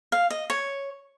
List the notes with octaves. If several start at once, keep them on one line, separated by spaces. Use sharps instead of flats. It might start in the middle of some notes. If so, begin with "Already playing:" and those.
F5
D#5
C#5